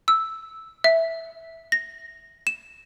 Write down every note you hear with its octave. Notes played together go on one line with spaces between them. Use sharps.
E6
E5
A#6
E7